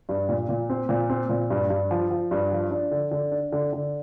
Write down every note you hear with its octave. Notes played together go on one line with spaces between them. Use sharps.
G2
A#2
A#2
C4
A#2
C4
A#2
G2
G2
F3
F3
G2
F3
D4
D3
D3
D4
D3
D3